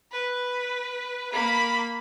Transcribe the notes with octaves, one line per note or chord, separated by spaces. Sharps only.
B4
A#3 B5